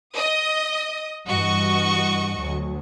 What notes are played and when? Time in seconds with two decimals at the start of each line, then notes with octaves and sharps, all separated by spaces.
0.15 D#5 D#6
1.27 G2 E3 F#4 D#5 C#6
2.37 D2 F#3